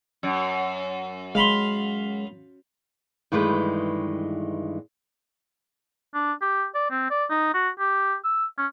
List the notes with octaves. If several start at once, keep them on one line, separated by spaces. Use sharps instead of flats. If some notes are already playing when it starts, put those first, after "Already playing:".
F#2
G#3 F5 B5 C6
G2 D#3 E3 G#3 A3 B4
D4
G4
D5
C4
D5
D#4
F#4
G4
E6
C#4